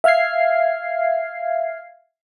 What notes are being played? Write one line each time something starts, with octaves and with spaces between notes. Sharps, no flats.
E5 F5 F6 G#6 C7